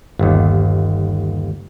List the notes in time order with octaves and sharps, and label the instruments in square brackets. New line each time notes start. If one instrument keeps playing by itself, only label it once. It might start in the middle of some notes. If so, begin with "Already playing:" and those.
[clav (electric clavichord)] G1 D#2